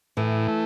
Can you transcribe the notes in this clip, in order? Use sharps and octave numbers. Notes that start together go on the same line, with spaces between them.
A2 E3
A3